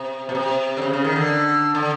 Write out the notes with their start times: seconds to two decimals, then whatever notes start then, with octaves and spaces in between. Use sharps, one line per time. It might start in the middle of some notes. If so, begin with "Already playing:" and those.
Already playing: C3
0.29 B2
0.35 C3
0.77 D3
0.82 C#3
0.93 C#3
1.05 D#3
1.16 D3
1.75 D3